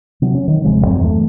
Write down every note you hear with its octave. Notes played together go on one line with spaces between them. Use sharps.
C3 F#3
C#4
D#3
D#1 C3 F3 G#3
E2 G2 F#3 C4
E3 A3